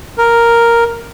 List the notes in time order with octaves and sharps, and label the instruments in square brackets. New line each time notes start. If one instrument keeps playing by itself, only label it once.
[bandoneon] A#4